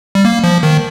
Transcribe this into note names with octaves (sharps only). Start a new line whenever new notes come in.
G3
A#3
F3
D#3